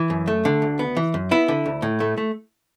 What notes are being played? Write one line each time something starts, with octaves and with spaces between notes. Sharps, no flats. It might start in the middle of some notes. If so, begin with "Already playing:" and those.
Already playing: E3
F#2
A3
D3
D2
B3
E3
F#2
B3 E4
D3
D2
A2
A3
A3